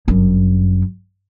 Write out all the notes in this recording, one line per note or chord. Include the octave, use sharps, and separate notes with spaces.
G1 F#2